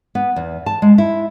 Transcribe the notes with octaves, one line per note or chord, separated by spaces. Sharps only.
B3
E2
A5
G#3
E4